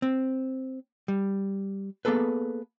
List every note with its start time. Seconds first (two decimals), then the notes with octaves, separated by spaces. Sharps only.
0.02 C4
1.08 G3
2.05 A#3 B3 G#4 A4 B4